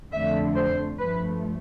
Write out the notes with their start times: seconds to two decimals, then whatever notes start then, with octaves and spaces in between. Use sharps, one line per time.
0.13 F2 D3 A3 E5
0.55 C5
0.98 G2 F3 A3 B4